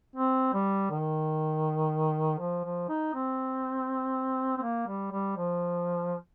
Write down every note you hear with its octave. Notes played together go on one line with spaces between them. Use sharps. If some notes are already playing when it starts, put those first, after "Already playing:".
C4
G3
D#3
F3
F3
D#4
C4
C4
A#3
G3
G3
F3